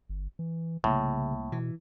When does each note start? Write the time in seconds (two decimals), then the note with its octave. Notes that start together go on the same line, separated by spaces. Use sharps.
0.09 G1
0.39 E3
0.84 C2 A2 C#3 A#3
1.52 B2 E3